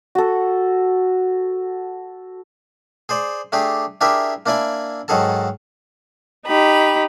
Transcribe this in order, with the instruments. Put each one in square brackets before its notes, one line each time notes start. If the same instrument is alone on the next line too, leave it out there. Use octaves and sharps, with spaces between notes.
[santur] F#4 A4
[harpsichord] G#4 C5 D5
A3 D4 G4 G#4
D4 E4 G4 G#4 A#4 E5
A#3 D4 E4 D5 G#5
G#2 D#3 F#3 G#4 A4 A5
[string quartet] D#4 G4 B5